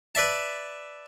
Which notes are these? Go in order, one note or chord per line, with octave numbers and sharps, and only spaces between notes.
B4 D5 E5 A5